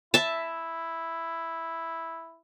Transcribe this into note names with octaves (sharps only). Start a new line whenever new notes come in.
E4 E5 A5